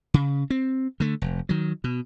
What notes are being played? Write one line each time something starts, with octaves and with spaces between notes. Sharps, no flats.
C#3
C4
D3 A3
F1
D#3 F#3
B2